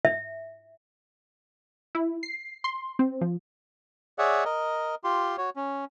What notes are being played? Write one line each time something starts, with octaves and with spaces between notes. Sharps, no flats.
E5
E4
C7
C6
C4
F3
G#4 C#5 D5 E5 F#5
A#4 D#5
F4 G4 C6
F#4 C#5
C#4